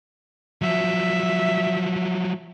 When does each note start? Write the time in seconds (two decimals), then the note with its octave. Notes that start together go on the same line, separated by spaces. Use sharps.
0.62 F3 F#3 E5